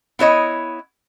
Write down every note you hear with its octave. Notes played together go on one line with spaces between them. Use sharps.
B3 E4 C#5 D#5